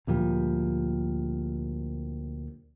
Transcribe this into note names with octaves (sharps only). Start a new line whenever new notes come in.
D2 A#2 F3 G3